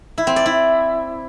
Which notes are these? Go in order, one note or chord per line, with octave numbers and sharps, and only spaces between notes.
E4
C4
D5
E4